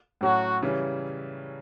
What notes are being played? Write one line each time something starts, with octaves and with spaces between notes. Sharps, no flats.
A2 F#3 C#4 F#4
C#3 E3 G3 C#4